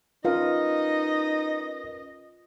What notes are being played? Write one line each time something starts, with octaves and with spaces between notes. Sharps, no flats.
C#4 D#4 F4 A#4 B4 D#5 F5